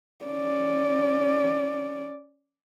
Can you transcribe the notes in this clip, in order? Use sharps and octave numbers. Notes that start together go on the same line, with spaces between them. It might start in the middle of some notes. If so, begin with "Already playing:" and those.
C#4 D5